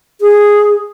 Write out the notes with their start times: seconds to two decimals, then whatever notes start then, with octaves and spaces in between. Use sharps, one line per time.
0.21 G#4